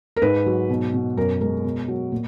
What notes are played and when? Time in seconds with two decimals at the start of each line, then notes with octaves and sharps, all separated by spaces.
0.16 A#4
0.22 G#2 B4
0.46 F#3
0.70 B2
0.94 B2
1.17 F#2 A#4
1.41 G#3 A#4
1.64 B2
1.88 F#3
2.12 A#2